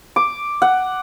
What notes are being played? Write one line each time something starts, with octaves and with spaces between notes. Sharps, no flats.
D6
F#5